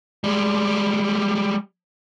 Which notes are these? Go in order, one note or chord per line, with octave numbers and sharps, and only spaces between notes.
G3 G#3